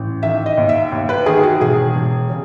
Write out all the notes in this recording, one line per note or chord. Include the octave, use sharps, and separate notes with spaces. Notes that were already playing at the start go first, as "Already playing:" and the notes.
Already playing: A1
D#3 E5
D#5
D#2
E5
D#2
B4
D#3 G#4
F#4
E1 G#4
E1
C#3